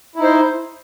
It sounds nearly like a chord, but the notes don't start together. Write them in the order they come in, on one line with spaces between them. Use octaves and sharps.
E4 D#4 C5